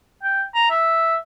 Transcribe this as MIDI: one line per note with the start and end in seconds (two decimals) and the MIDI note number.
0.23 0.43 79
0.54 0.70 82
0.70 1.16 76